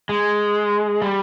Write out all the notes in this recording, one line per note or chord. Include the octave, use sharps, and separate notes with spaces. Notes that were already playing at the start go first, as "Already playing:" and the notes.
G#3
G3